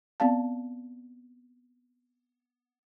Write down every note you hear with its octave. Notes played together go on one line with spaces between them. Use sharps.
B3 C4 D5 F5 A5